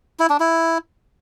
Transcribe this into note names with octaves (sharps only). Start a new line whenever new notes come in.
E4
D4
E4